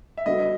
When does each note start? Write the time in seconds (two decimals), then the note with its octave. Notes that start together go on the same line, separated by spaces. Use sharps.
0.17 E5
0.26 G3 B3 D4 F#4 A4 D#5